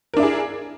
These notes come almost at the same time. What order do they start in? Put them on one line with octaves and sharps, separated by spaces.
A#4 D4 E4 G#4